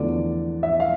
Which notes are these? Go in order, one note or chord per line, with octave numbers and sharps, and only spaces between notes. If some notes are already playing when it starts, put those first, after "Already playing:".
Already playing: E2 D3 F3 A3 D5
E5
F5